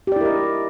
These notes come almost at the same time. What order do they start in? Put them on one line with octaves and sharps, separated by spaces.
G4 D5 E4 A#4 D#5